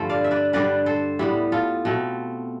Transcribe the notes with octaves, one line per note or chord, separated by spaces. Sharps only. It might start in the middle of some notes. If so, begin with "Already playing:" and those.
Already playing: G2 D3 F3 A3 A4 C5
D5 F5
E5
B4 D5
G2 D3 G3 B4 D5
A4 C5
A2 G3 B3 E4 G4
F4 A4
B2 A3 C4